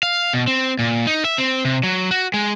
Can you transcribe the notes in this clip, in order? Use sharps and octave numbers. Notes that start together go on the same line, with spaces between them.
F5
B2
C4
A#2
D#4
E5
C4
C3
F#3
F#4
G#3